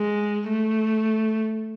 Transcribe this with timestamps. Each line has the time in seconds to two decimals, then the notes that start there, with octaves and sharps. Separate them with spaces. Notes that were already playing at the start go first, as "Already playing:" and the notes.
Already playing: G#3
0.47 A3